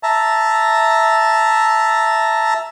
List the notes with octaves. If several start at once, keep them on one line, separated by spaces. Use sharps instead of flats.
E5 A5 A#5